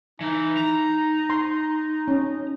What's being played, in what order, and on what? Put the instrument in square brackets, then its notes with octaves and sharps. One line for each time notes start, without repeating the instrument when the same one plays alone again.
[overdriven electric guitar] E3 [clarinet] D#4
[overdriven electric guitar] A#5
[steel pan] C6
C#4